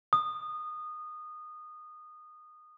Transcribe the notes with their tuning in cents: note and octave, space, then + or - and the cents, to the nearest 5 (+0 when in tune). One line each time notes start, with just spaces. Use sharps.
D#6 -20